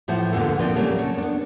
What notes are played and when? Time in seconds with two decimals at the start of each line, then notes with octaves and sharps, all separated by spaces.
0.08 A2 E3 F3 A3 C5 F#5
0.33 D#2 G#2 D3 B3 F4 A4
0.59 A#2 F3 B3 C4 D4
0.76 C#3 F#3 G3 A3 A#3
0.99 C#5
1.18 B3 D4